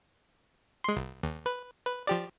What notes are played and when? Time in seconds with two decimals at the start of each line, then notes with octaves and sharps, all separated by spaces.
0.84 G#3 C6
0.96 C2
1.23 D#2
1.46 B4
1.86 B4
2.07 F3 G4 D5